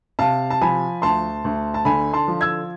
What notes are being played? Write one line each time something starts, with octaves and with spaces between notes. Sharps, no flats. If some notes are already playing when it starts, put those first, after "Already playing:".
C3 F5 A5
A5
F3 G#5 B5
D2 A5 C6
D2
A5
D3 G#5 B5
A5 C6
F3
E6 G#6